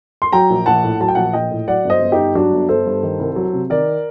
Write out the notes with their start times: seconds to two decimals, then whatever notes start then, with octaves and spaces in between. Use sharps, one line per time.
0.22 C6
0.32 F#3 G5 A#5
0.50 A#1
0.66 A#1 F#5 A5
0.83 A2
1.00 F#3 A5
1.08 G5
1.15 A#1 F#5 A5
1.33 A#1 D#5 G5
1.51 A2
1.67 F#3 D5 F#5
1.84 G1
1.90 C5 D#5
2.02 G1
2.12 D#4 G4
2.18 G2
2.35 F#3 D4 F#4
2.52 G1
2.69 G1 A4 C5
2.86 G2
3.03 D#3
3.19 C2
3.36 F#3
3.53 C3
3.70 D#3 A#4 D5